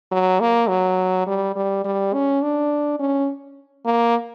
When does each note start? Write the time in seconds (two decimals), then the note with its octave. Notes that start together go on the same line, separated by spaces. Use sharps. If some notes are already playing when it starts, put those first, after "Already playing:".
0.11 F#3
0.40 A#3
0.69 F#3
1.27 G3
1.56 G3
1.84 G3
2.13 C#4
2.42 D4
2.99 C#4
3.85 A#3